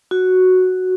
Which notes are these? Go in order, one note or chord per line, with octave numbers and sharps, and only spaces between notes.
F#4